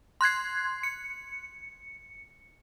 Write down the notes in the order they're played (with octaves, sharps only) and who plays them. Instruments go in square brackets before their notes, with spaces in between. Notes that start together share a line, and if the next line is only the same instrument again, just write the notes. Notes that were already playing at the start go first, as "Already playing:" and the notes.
[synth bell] C6 F#6 G#6 C7
C#7